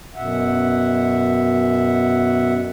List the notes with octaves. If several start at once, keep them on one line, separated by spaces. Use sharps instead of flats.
F#2 B2 E5 F#5